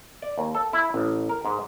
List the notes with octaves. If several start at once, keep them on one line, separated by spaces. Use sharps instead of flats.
D5
D#2
A4
E4
A1
A#4
G#2